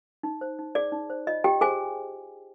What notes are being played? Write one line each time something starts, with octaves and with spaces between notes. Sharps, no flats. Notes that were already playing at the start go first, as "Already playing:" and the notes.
D#4
C5
D#4
G#4 D5
D#4
C5
F4 D#5
F4 G4 G5
G#4 C5 G#5